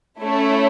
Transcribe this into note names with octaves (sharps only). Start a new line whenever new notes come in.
A3 C#4 E4